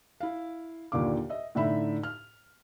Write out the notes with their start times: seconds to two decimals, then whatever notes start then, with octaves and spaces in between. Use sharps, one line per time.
0.20 E4 F5
0.92 D#2 A#2 D3 F5 D6
1.30 D#5 E5
1.55 A2 D3 D#4 E5 B5
2.03 F6